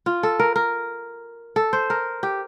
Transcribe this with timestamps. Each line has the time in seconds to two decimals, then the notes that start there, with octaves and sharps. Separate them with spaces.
0.06 F4
0.23 A4
0.39 A#4
0.56 A#4
1.56 A4
1.73 C5
1.90 A#4
2.23 G4